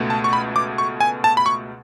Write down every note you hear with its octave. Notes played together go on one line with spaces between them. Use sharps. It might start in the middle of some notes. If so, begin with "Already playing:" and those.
Already playing: C#2 B2 A3
A5
C#6
B5
D6
C#6
G#5
A5
B5
C#6